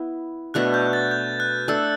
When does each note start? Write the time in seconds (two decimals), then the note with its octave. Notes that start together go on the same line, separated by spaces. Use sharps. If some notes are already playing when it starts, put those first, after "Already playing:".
Already playing: B3 E4
0.54 B2 A3 D4 A4 F#6
0.74 G6
0.93 A6
1.11 G6
1.40 F#6
1.68 A3 D4 A4 E6